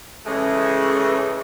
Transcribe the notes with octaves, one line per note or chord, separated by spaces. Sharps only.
C#3 E3 G#3 A3